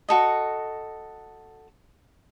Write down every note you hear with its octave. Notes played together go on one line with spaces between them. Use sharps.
F#4 A4 D#5